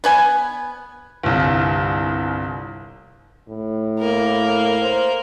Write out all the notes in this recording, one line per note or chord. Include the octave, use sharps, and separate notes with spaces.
B3 B4 G#5
G1 C2
A2
A#3 A#4
C5